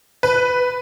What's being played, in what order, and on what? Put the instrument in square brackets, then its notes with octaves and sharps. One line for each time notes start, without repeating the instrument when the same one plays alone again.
[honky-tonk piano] B4